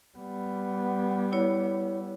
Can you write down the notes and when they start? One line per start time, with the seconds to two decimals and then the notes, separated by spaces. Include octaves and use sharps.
0.18 G3 B3
1.32 E4 C#5